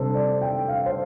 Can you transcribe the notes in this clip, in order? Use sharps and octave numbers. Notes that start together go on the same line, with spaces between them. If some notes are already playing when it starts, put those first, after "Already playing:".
Already playing: C3 G3 D4 A4 C5
D5
G5
F5
C5